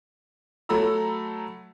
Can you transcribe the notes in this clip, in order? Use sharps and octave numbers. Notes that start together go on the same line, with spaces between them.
F#3 A3 A4 A#5 B5 E6